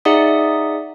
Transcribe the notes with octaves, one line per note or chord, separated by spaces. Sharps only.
D#4 G#4 D5 E5 F#5 D#6